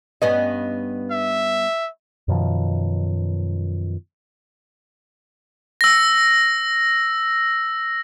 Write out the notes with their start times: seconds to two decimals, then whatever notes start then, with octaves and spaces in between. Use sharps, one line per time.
0.22 G2 B3 C#4 D#5
1.11 E5
2.28 F#2 B2 D#3 F3
5.81 E6 A#6